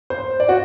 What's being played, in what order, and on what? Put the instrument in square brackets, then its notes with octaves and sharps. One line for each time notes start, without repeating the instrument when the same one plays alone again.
[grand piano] C5
D5
F#4